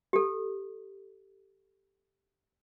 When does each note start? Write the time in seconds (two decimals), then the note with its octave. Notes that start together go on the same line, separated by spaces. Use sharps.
0.13 G4 A4